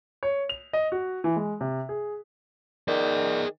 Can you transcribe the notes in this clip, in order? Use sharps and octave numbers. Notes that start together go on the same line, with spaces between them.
C#5
F7
D#5
F#4
E3
G#3
C3
G#4
D#3 G#4 D5